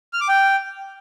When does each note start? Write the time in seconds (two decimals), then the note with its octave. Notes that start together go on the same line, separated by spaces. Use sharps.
0.13 F6
0.21 D6
0.28 G5